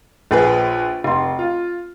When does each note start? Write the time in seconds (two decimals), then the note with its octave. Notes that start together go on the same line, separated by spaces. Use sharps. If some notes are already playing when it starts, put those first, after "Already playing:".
0.31 A#1 G#4 B4
1.04 F1 C6
1.39 F4